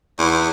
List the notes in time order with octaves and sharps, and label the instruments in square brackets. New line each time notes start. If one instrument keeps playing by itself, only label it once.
[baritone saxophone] E2